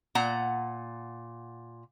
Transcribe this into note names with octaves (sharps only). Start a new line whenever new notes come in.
A#2 F#5 A#5